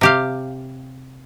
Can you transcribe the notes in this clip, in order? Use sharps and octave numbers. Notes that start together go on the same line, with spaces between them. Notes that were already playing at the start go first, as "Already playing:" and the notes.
C3 G4 F5